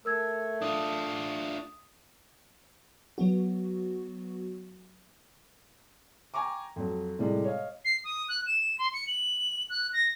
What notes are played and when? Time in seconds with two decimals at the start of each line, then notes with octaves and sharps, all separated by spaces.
0.05 A3 A#4 E6 G#6
0.62 D4 F4 D#6
3.18 F#3 B3 F#4
6.34 G5 G#5 A#5 C#6 D6
6.76 F2 F#3
7.19 A2 C3 G3 G#3
7.45 C#5 D#5 F5
7.85 C7
8.04 D#6
8.29 F#6
8.46 E7
8.78 C6
8.93 C#7
9.07 F#7
9.70 F#6
9.93 A#6